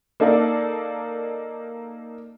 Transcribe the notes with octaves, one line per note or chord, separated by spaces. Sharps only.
A#3 D#4 A4 D5 F5